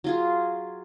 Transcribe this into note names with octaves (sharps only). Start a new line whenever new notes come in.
F#3 F4 G#4